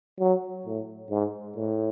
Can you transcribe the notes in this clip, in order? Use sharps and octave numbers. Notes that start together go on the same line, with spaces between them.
F#3
A2
G#2
A2